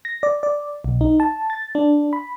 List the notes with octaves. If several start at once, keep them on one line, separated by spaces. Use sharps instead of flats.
A#6
D5
D5
B1
D#4
A5
A6
D4
B5